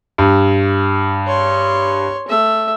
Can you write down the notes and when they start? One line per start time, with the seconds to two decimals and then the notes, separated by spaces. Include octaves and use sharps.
0.18 G2
1.27 C#5 C6
2.28 A3 E5